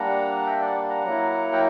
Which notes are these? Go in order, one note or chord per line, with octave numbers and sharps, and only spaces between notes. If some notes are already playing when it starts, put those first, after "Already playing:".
Already playing: G3 A#3 D4 F#5 A#5
E5 G5
D5 F#5
F#5 A#5
F#3 A#3 E4
G5